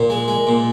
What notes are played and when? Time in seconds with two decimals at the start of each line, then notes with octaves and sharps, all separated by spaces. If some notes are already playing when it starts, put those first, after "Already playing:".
Already playing: A#2
0.10 G#3
0.28 G#3
0.47 A#2